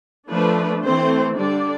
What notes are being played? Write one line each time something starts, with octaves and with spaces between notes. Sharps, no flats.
F3 A3 D4 B4
E3 A3 C4 C5
D3 G3 D4 D5